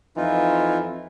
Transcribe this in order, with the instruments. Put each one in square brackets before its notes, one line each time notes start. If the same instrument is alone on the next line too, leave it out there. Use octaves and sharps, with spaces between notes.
[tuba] F2 [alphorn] E3 [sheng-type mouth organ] D#4 F4